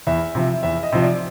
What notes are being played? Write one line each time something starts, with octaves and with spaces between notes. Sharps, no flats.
E2 E5
C3 F3
E2 E5
D#5
C3 F3
D5